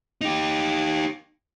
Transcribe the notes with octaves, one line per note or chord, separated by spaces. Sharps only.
D#4 G4